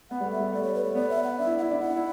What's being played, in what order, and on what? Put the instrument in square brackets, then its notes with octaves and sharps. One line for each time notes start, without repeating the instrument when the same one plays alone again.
[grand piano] B3 [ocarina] F#5
[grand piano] G3
A3
[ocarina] E5
[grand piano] G3
[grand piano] A3 [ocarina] D5
[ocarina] C#5
B4
C#5
[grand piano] B3 [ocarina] D5
[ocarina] E5
F#5
[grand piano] D4 [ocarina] E5
[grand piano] E4
D4
[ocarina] F#5
[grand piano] E4 [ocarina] E5
[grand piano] D4
[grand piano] E4 [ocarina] F#5
[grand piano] D4
E4